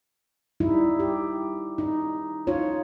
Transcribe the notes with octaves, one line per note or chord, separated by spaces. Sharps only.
G3 D#4 E4
G4
D#4
D#4 F4 C#5